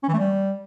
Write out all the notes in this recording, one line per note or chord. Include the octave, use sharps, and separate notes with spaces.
C#4
E3
A3
G3